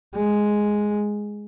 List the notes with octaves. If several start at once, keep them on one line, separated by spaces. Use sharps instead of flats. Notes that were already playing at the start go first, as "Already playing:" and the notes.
G#3